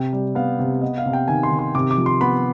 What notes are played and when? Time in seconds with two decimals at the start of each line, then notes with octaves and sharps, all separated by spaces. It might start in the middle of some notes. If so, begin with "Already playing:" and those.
Already playing: C3 G5
0.13 G3
0.35 B3 F5
0.59 C3
0.81 B3 D#5
0.98 F5
1.06 C3
1.13 G5
1.28 D#3 G#5
1.43 C6
1.51 D#3
1.59 C6
1.75 C3 D6
1.91 D6
1.98 F3
2.06 C6
2.21 B3 B5